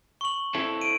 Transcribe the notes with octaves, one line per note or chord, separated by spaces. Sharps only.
C#6 F#7
C4 E4 A4
D7 D#7